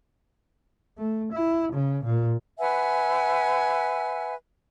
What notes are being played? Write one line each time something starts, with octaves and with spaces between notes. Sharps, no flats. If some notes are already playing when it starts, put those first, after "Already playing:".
A3
E4
C#3
A#2
B4 E5 F#5 G#5